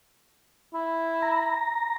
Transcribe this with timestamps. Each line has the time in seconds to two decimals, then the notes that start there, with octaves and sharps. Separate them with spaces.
0.74 E4
1.22 A#5